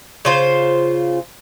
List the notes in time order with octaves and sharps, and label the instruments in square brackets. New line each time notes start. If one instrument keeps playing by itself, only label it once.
[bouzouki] C#3 F4 C5